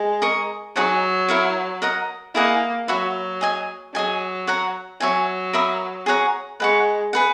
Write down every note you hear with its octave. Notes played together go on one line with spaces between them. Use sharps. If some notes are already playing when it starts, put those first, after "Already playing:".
Already playing: G#3
A#4 D#5 A#5 C#6
F#3 D#4 G#4 C#5 F#5
E4 A#4 C#5
A#4 D#5 F#5 A#5
A#3 E4 G#4 D#5 F#5
F#3 F#4 C#5 E5 B5
G#4 D#5 G#5
F#3 G#4 D#5 G#5
C#5 F#5 A#5
F#3 C#5 E5 G#5
A#4 E5 B5 D#6
G#4 C#5 F#5 A#5
G#3 B4 F#5 C#6
G#4 B4 F#5